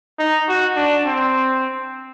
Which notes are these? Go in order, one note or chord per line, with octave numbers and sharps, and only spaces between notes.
D#4
F#4
D4
C4